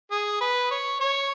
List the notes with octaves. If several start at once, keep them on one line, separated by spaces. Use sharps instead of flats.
G#4
B4
C#5
C#5